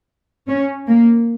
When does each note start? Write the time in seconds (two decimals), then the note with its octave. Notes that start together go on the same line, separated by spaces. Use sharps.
0.48 C#4
0.88 A#3